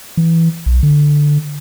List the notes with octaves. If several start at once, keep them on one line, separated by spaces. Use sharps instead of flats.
E3
B1
D3